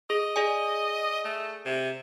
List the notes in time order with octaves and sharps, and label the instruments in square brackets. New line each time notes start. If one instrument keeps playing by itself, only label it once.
[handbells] G#4 [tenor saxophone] D#5
[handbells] G#4 D5 G#5
[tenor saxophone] A3
C3